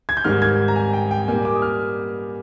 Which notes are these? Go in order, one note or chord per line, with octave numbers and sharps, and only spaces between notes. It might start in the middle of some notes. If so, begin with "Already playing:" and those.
G#6
G6
G#2 D#3 G3 F6
G#6
A#5
G#5
G5
G5
A#2 G3 A#3 G#5
D6
D#6
F6